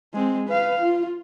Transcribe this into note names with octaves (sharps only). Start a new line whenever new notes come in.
G#3 C4
B4 F5
F4